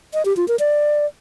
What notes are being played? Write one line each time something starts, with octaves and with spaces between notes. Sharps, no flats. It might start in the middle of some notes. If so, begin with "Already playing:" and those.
D#5
G4
F4
A#4
D5